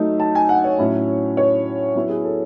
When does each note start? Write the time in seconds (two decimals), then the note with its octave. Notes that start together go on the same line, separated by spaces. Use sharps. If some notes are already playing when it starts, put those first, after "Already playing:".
Already playing: F#3 A3 D#4
0.20 A5
0.35 G#5
0.49 F#5
0.64 C#5
0.79 A2 F#3 C#4 E4
1.37 C#5
1.95 F#3 B3 E4
2.10 G#4
2.24 A4